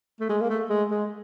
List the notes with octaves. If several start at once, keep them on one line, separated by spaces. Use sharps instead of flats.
A3
G#3
A#3
A3
G#3
G#3